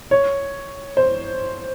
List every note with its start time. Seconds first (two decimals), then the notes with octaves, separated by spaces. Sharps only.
0.11 C#5
0.97 C5